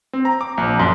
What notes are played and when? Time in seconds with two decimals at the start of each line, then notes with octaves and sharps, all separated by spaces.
0.13 C4
0.25 A#5
0.41 D6
0.58 A#1
0.79 F#2